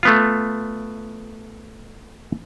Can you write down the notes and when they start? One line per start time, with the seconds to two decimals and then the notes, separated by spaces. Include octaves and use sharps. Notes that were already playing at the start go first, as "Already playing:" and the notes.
0.03 A3 B3 F4